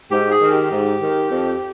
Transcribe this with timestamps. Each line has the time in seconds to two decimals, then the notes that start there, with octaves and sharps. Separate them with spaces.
0.11 G#2 G4
0.32 G#4
0.42 D#3
0.52 G4
0.71 G#2
1.02 D#3
1.31 F2